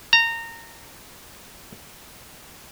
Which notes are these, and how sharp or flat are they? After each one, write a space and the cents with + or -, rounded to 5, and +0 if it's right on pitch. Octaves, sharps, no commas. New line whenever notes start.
A#5 -20